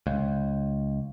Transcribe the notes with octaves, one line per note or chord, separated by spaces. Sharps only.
C#2